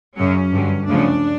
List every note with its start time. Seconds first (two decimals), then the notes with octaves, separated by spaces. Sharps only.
0.17 F#2 C#3 F#3 C#4
0.52 G2 D3 F#3
0.86 D2 C#3 F3 D4